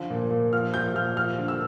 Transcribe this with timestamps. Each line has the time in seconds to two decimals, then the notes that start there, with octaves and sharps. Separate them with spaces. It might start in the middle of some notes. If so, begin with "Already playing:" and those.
Already playing: D3 F3
0.10 A#2
0.31 A#2
0.53 F3 F6
0.74 F3 G6
0.96 A#2 F6
1.17 F3 F6
1.38 D3
1.48 E6